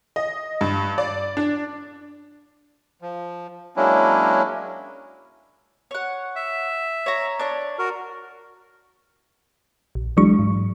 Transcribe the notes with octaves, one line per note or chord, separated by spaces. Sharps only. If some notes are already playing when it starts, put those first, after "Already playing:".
D#5
G2
D5
D4
F3
F#3 G#3 A#3 C#4 D4 E4
C#5 F#5
E5
C#5 A#5
D4 C#5
F#4 A#4
A#1
E3 F#3 G#3 D4 C#6
G#2